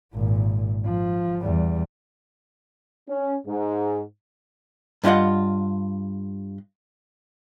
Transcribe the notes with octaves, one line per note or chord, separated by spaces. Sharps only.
G#1 A#2
F3
E2 G3
C#4
G#2
G2 E4 F4 D#5 F#5